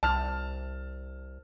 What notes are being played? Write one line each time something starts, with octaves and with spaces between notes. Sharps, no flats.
C2 A5 F6